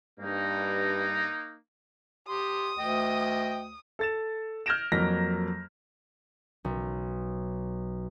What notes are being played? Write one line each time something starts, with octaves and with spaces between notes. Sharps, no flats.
G2 A#3 D#4
G4 C6 D#6
D2 D#5 G5
A4 A6 E7
F6 G6 G#6 A#6 D7 E7
F2 F#3 A#3 A#6 B6
B1